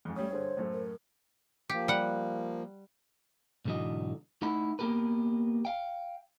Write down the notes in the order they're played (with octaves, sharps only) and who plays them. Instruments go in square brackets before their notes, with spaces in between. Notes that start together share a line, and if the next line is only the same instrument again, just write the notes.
[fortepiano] F2 G#2
[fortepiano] G3 C#4 D#6 [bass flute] A3 [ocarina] C#5
[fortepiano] G2 D3 G#4 [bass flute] C5
[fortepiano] F#2 A2 A3
[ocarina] A#4
[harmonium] F3 A#3 [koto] G4
[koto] G3 F#5
[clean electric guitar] B1 G#2 D3 E3 F#4 D#5
A3 D#4 E4 F#5 B5
A#3 B3 C#4 G4 A#4 B4
F5 G5